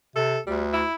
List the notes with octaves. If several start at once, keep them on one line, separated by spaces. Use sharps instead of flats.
C3 A4
D2 G3
E4